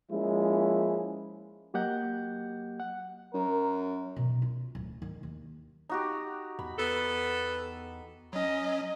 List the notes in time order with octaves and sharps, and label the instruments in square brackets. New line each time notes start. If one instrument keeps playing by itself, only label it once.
[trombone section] F3 G#3 A#3 C#4 E4
[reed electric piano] F#3 A#3 G4 D#5 F#5 G6
F#5
[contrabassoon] F#2 [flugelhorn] A#4
[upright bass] B2
F4
D1
D#3
D#2
[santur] D#4 F#4 G4
[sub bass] E2 [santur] B5
[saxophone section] B3 A4
[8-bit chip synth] F#3 C#4 [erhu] D#5